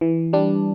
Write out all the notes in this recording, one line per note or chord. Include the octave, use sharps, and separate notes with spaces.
E3
G3 D4